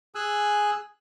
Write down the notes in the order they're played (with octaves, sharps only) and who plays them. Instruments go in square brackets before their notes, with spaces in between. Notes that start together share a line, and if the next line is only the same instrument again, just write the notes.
[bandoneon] G#4 G#5 E6 F#6